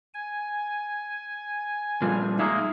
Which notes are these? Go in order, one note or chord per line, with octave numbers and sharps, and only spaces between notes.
G#5
A#2 F3 G3
G#3 A#3 D#4 G#4 E5